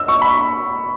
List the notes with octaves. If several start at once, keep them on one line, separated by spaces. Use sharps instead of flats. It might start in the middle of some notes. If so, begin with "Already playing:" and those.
Already playing: E6
C#6
B5